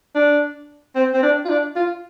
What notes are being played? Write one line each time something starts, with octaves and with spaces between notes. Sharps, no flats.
D4
C4
C4
D4
F4
D4
F4